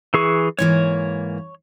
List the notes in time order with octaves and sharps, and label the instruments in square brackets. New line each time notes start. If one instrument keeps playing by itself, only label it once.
[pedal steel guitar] E3 G#4 C#6
[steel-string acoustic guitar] G#2 E3 A#3 [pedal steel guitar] C#5